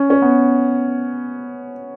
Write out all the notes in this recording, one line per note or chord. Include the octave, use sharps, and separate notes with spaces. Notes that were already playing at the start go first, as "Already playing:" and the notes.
Already playing: C#4
C#4
B3